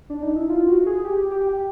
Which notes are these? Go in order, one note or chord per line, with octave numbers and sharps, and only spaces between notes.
D4
D#4
E4
F4
F#4
G#4
G4
G4
G4